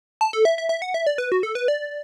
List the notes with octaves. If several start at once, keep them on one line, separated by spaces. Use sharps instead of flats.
A5
A4
E5
E5
E5
F#5
E5
D5
B4
F#4
A4
B4
D5